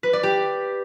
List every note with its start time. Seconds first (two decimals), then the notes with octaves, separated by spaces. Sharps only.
0.03 B4
0.13 D5
0.23 G4